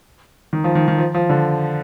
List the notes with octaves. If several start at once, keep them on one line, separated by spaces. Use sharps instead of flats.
D#3
F3
D#3
D#3
F3
F3
D3